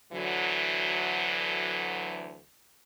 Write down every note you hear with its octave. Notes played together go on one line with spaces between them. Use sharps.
D2 D3 E3 F#3